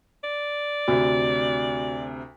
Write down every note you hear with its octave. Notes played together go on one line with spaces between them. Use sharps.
D5
D2 C3 F#4